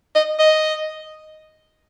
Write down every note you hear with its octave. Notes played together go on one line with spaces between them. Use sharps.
D#5
D#5